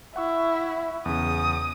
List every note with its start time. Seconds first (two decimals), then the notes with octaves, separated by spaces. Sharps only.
0.16 E4 F#5 C#6 E6
1.06 E2 C#3 D#6